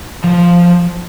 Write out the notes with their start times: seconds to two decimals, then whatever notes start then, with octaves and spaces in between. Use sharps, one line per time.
0.24 F3